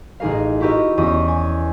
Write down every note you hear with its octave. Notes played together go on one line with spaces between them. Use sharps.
A1 D#4 G#4 A#4 F5
E4 F#4 G4 A#4 D#5
E2 C#4 G4 D#5 D#6
G#5